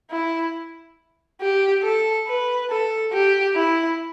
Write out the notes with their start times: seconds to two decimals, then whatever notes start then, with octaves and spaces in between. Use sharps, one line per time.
0.11 E4
1.41 G4
1.84 A4
2.28 B4
2.70 A4
3.14 G4
3.56 E4